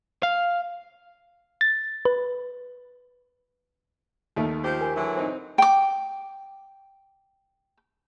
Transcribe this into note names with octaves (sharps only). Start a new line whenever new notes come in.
F5
A6
B4
D#2 D#3 A3
F3 G4 C5
A#4 G#5
D3 E3 F#3
C4 D#4
G5 D6